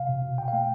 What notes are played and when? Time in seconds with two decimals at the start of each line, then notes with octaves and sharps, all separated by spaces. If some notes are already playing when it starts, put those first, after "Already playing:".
Already playing: C3 F5
0.09 B2
0.23 B2
0.38 B2 G5
0.48 F5
0.53 A3 G5